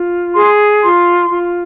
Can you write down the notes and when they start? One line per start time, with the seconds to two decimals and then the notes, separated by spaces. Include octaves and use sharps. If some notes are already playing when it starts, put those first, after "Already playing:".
Already playing: F4
0.35 G#4 C6
0.82 F4 C6
1.30 F4